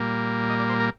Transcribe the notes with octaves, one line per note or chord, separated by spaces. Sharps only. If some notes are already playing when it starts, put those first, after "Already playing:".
Already playing: A#2 G3 A#3
D#5
D5
C5
A#4